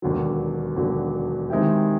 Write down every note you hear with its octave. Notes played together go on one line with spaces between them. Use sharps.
E1 D#2 D3 F#3
E1 D#2 D3 F#3
D#3 G#3 C4 E4 G4